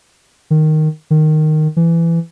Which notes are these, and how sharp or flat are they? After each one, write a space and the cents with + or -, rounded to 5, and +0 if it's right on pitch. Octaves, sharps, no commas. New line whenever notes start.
D#3 -5
D#3 -10
E3 +20